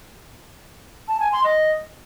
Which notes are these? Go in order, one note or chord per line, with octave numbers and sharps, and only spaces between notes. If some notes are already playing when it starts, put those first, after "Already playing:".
A5
G#5
C6
D#5